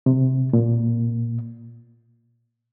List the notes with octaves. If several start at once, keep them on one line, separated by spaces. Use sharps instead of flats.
C3
A#2